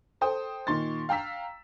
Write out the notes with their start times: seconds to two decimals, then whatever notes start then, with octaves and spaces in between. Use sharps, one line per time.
0.21 A4 C5 G5 D#6
0.67 A#2 D#3 C6 C#6 A6
1.09 F5 G5 A#5 E6 B6